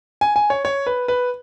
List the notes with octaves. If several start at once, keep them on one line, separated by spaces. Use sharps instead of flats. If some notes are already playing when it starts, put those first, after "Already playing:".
G#5
G#5
C#5
C#5
B4
B4